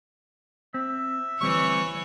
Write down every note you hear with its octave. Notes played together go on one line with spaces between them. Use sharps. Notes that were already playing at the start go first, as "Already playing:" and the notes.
C4 E5
D2 E3 G3 C4 C#5 C#6